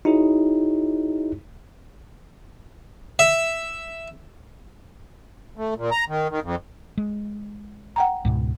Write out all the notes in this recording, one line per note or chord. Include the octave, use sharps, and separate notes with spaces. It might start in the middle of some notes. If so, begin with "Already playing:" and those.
D#4 E4 F#4 G#4 C#5
E5
A3
A#2
A#5
D#3
D#3
F2
G#3
F#5 G5 A#5
C#2 G#2 B2